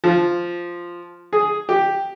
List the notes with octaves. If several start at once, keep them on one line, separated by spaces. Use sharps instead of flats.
F3
G#4
G4